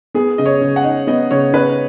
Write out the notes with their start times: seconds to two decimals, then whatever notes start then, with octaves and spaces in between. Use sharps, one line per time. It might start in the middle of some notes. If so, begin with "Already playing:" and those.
0.14 B3 G#4
0.38 C#3 D#5
0.46 C#5
0.61 C#3
0.76 F#5
0.84 D#4
1.07 B3 D#5
1.31 C#3 C#5
1.53 C#3 B4